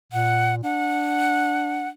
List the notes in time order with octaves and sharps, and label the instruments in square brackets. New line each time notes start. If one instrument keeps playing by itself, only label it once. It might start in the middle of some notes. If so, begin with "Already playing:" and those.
[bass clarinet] A#2 [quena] F#5
[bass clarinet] D4 [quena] F#5